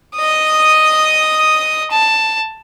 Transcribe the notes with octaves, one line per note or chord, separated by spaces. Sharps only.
D#5 D#6
A5